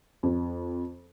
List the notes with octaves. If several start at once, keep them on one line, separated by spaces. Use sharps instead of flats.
F2